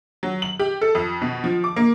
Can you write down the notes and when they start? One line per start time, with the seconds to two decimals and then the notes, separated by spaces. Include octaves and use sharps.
0.23 F#3
0.42 F#7
0.59 G4
0.81 A4
0.95 F2
1.22 B2
1.44 F3
1.64 D6
1.76 A#3